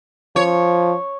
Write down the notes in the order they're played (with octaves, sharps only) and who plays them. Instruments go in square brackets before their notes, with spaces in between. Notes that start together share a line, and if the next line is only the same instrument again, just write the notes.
[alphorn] F3 [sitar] C#5